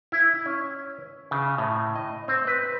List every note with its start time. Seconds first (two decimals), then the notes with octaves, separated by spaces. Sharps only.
0.12 E4
0.46 C#4
1.31 C#3
1.58 A2
1.95 D#5
2.28 C4
2.47 B4